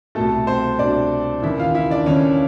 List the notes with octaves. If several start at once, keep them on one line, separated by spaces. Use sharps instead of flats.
C2 B2 A3 A4
C4 C5
C2 B2 D4 D5
D#2 C#3 E3 E4 E5
F4 F5
E4 E5
D4 D5
D#2 C#3 E3 C#4 C#5